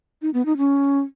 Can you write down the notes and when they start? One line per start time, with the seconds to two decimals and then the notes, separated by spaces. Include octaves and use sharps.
0.22 D#4
0.34 B3
0.46 D#4
0.57 C#4